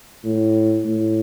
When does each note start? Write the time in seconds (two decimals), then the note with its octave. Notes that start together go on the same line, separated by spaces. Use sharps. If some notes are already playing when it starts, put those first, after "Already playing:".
0.24 A2
0.86 A2